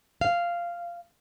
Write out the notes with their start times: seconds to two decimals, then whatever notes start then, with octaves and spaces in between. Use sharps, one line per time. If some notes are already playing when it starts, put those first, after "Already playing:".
0.21 F5